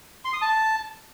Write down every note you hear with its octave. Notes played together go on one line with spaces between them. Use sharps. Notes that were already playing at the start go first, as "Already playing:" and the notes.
C6
D#6
A5